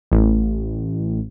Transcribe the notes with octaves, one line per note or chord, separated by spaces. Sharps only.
A1